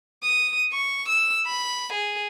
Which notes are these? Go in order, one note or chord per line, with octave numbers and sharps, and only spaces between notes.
D#6
C#6
E6
B5
G#4